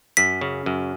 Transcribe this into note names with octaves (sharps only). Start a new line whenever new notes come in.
F#2 B6
C#3
F#2